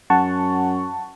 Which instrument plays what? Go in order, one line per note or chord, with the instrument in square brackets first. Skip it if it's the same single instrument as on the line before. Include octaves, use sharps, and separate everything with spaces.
[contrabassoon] F#2 [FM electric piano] F#5 A5 C#6